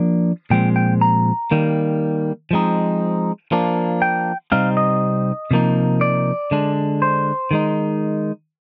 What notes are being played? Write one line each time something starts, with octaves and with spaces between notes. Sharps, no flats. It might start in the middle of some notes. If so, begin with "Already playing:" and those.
Already playing: F3 A#3 D4
A#2 F3 G#3 C4 G5
G5
A#5
D#3 G3 A#3
F3 G#3 C4 D#4
F3 A#3 D4
G5
C3 G3 C4 D#4 F5
D#5
C3 F3 A#3 D#4
D5
D3 G#3 D4
C5
D#3 G#3 D#4